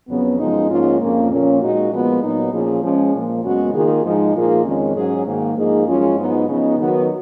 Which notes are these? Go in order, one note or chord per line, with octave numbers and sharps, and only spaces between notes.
F2 C#3 F#3 B3
F#2 F3 G#3 B3 D#4
G#2 F3 A#3 C#4 F4
F2 C#3 F3 A#3
A#2 F3 A#3 C#4
A#2 G#3 D#4 F#4
A#2 F3 G#3 B3
A#2 F#3 B3 D#4
A#2 F3 A#3 C#4 G#4
F3 G#3 C#4
A#2 F3 A#3
F#2 C#3 G#3 B3 F#4
D#3 A#3 F4 G#4
G#2 F3 G#3 D#4
A#2 F3 A#3 F4 G#4
F2 D#3 G#3 C#4
G#2 F#3 C#4 G#4
G#2 D#3 A#3
G#2 F3 A#3 D#4 G#4
F#2 F3 G#3 C#4 F4
G#2 F#3 B3 D#4
C#3 F3 B3 D#4
D#3 F#3 B3 F#4